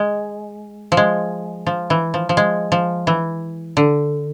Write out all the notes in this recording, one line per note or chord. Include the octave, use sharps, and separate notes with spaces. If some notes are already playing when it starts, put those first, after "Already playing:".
Already playing: G#3
F3
G#3
F3
E3
F3
F3
G#3
F3
E3
D3